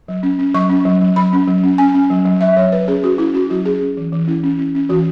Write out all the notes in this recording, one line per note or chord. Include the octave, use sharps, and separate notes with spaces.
F#3
C#4
C#4
F#3 C#6
C#4
F#3
F#3
F#3 B5
C#4
F#3
C#4
C#4 G#5
C#4
F#3
F#3
F#3 E5
F#3 C#5
F#3 B4
C#4 G#4
C#4 F#4
C#4 E4
C#4 F#4
F#3 F#4
C#4 G#4
C#4
E3
E3
C#4 E4
C#4
C#4
C#4
E3 F#4